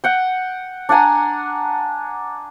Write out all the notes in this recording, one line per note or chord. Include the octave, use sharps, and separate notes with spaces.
F#5 G5
D4 F#5 G#5 A#5